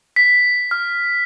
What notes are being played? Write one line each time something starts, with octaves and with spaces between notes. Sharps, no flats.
B6
F6